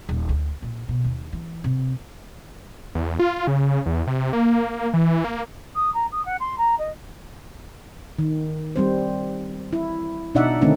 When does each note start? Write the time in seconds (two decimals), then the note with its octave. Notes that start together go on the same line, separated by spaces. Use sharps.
0.09 D#1
0.29 D2
0.62 A#2
0.89 B2
1.04 D#2
1.33 E3
1.64 C3
2.95 E2
3.19 F4
3.47 C#3
3.86 E2
4.07 C3
4.33 A#3
4.94 E3
5.24 A#3
5.75 D#6
5.94 A#5
6.12 D#6
6.25 F#5
6.40 C6
6.58 A#5
6.78 D#5
8.19 D#3
8.76 G3 C4 C5
9.73 E4
10.35 B2 D4 D#4 D5 E5 F#5
10.61 D3 D#3 A3 C4 C#4 D#4